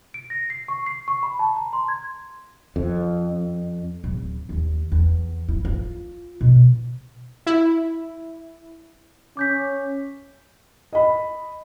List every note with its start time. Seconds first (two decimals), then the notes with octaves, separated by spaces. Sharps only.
0.14 D7
0.30 A#6
0.50 C7
0.68 C#6
0.86 C7
1.08 C#6
1.23 B5
1.39 A5
1.56 A#5
1.73 C6
1.88 G#6
2.76 F2
4.04 D1
4.49 D#2
4.92 E2
5.49 E4
5.65 F4
6.41 B2
7.46 E4
9.37 C#4 D6 G6 B6
10.93 D#5 B5